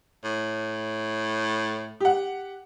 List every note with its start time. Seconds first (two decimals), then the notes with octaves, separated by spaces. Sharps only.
0.24 A2
2.00 G4 F#5